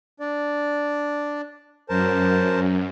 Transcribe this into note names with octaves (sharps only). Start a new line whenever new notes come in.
D4 D5
F#2 A#4 C5 A5